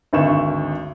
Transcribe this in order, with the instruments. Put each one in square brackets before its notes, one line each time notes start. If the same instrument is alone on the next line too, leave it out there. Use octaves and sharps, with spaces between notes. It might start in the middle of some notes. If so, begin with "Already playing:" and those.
[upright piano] G#1 D2 C#6 E7